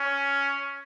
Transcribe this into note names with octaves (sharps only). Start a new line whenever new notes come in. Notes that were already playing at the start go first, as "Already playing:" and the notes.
Already playing: C#4